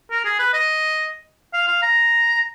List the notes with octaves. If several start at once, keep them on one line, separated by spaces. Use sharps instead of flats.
A#4
G#4
B4
D#5
F5
F5
A#5